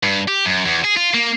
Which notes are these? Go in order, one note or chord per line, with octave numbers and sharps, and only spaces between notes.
G2
G4
F#2
E2
G#4
F4
A#3